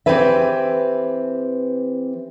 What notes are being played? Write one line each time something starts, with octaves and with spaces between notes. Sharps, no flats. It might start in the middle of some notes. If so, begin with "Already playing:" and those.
E3 C4 G4 G#4 B4 E5